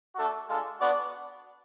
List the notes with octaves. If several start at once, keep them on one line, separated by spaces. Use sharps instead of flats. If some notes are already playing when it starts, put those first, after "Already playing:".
A3 D4 F#4 A4
G#3 D4 F4 A4
B3 D4 F#4 D5